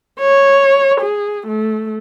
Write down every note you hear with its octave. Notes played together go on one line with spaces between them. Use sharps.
C#5
G#4
A3